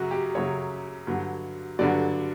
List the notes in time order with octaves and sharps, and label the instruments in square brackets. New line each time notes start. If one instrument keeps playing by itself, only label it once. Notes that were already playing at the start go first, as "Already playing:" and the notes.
Already playing: [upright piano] F#2 C#3 F#3 F#4
G4
F#2 C#3 F#3 C#5
G2 D3 F#3
G2 D3 F#3 D5